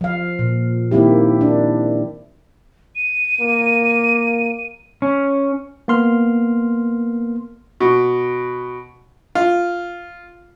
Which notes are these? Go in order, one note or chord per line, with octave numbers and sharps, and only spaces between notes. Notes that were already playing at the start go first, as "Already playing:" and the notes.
F3 F5
A#2
D#3 A#3 C4 E4 G4
D4
D#7
A#3
C#4
A#3 B3 C6 F6
B2
F4